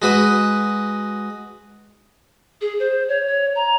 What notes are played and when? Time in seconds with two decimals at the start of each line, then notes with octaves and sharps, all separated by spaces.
0.02 G#3 F#4 B4 D#6
2.61 G#4
2.79 C5
3.08 C#5
3.26 C#5
3.55 A#5